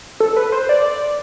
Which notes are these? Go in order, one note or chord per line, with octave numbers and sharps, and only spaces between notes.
A4
B4
C5
D5